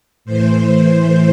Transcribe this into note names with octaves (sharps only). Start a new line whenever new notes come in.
A2 E3 C5
C5